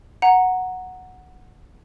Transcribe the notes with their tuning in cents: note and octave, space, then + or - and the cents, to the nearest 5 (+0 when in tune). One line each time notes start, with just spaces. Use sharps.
F#5 -5 A#5 +0